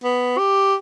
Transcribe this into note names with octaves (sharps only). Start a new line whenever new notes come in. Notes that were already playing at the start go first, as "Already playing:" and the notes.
B3
G4